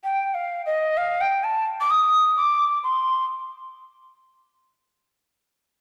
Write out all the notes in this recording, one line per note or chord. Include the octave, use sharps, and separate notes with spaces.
G5
F5
D#5
F5
G5
A5
D6
D#6
D6
C6